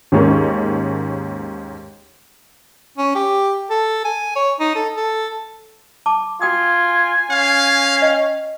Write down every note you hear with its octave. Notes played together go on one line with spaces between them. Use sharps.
D#2 G#2 C#4 A#4
C#4
G4
A4
G#5
C#5
D#4
A4
A4
A5 D6
F4 F#4 G5 G#5 D#6
C#4 F5
D#5 G5